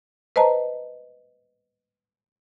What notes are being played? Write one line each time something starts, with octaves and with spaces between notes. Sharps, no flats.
B4 C5 D#5 A5 A#5